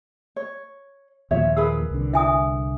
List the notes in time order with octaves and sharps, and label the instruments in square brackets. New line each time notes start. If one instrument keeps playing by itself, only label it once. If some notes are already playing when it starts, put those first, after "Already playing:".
[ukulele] C#5
[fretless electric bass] D#2 A#2 F3 [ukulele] C#5 E5
[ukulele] G#4 A#4 B4 [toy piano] E6
[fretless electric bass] C2 D3
[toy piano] E5 G#5 D#6